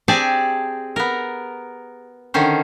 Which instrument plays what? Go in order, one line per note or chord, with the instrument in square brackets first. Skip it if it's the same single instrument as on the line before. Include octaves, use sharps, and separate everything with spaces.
[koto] C4 G4 G#4 D5 G#5 A5
B3 A#4
D3 D#3 C#4 C5